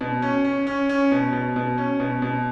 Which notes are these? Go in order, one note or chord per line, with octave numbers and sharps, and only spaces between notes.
B2
C#4
C#4
C#4
C#4
B2
B2
B2
C#4
B2
B2